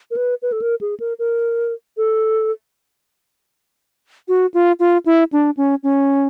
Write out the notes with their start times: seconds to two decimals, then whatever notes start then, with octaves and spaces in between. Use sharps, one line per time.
0.11 A#4
0.17 B4
0.42 B4
0.52 A4
0.62 A#4
0.81 G#4
1.00 A#4
1.19 A#4
1.97 A4
4.28 F#4
4.54 F4
4.80 F4
5.06 E4
5.32 D4
5.57 C#4
5.83 C#4